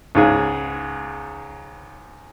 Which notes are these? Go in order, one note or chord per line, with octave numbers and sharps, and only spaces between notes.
C#2 G#2 G#4